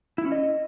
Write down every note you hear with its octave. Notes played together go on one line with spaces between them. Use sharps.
E4
C#4
D#5